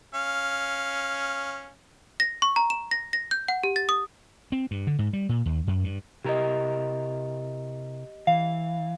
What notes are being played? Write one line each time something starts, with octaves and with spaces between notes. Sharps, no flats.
C#4 F5
A#6
C#6
A#5
E7
A#6
A#6
G6
F#5
G4
A6
D#6
C4
G2
D3
G#2
G3
A#2
D#2
F#2
G2
C3 E4 G4 A#4 D#5
E3 F5